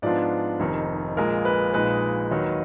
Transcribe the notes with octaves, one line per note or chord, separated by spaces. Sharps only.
G#2 F3 B3 D4 F4 D5
F1 F2 D#3
A#1 A#2 G#3 A#4
B4
A#1 A#2 G#3 D#4 B4
D#2 D#3 F#3